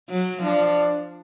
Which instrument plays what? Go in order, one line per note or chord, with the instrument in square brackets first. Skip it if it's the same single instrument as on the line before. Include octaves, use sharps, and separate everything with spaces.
[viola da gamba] F#3
[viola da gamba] F3 [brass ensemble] D4